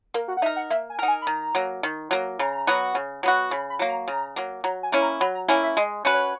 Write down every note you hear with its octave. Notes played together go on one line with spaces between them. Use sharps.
A#3 A#4
F#4
F#5
D#4 A#4 E5
F#5
A#3 E5
G#5
D#4 A#4 F#5
G#5
B5
D#3 A#5
F#3 A#3
D#3
F#3 A#3
C#3 A#5
F#3 B3 F#4
C#3
F#3 B3 F#4
C#3 B5
B5
F#3 A#3
A#5
C#3 A#5
F#3 A#3
F#3 A#5
G#5
A#3 C#4 E4
A#5
F#3 B5
A#5
A#3 C#4 E4 G#5
E5
G#3 D#5
C#4 F#4 B4
C#5